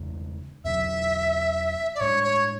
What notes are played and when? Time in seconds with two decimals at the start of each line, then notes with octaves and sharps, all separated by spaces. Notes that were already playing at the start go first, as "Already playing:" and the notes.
Already playing: E2 C#3 E3 G#3
0.65 E2 B2 F#3 E5
1.95 D5
2.00 A2 G#3 D4 C#5
2.24 C#5